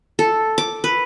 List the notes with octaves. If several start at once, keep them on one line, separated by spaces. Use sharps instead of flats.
A4
D6
B4